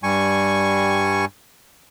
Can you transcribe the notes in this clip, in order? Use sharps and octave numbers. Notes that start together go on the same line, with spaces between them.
G2 G3 G#5 C#6